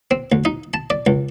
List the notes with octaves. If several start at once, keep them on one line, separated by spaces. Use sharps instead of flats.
C4
D2
D#4
A5
D5
C#2